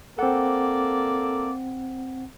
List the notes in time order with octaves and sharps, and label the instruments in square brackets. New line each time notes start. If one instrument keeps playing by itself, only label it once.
[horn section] A#3 A4 D5 [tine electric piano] C4 F#5